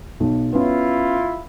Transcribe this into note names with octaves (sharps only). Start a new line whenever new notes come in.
B1
B3 C#4 E4 F4